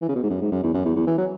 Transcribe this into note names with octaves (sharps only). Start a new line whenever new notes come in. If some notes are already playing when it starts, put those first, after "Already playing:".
E3
C#3
B2
G#2
F#2
G#2
F#2
E2
F#2
E2
E2
E3
F#3